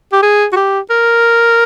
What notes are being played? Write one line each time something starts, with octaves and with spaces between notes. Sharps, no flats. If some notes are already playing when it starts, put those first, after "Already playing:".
G4
G#4
F#4
G4
A#4